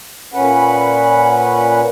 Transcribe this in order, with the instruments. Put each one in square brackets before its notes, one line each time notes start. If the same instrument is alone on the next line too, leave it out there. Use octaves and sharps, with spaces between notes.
[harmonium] A#2 C#4 B4 F#5